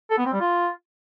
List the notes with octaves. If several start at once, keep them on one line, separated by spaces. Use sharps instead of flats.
A4
B3
C4
G3
F4